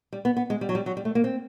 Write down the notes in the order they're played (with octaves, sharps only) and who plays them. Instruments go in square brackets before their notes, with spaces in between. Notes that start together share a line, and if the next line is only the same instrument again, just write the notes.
[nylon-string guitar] G3
B3
B3
G#3
G3
F#3
G3
F#3
G3
A3
A#3
C4